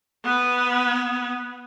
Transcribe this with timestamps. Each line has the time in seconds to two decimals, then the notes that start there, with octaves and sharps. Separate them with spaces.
0.24 B3 B4